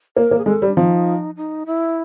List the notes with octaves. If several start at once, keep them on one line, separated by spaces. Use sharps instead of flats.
A#3 A#4
A#3
G#4
G#3 A4
G3
D4
F3 D#4
D#4
E4